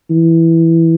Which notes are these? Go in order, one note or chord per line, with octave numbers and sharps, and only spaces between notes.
E3